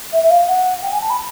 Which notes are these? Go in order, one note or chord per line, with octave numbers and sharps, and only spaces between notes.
E5
E5
F5
F#5
G5
G#5
A5
B5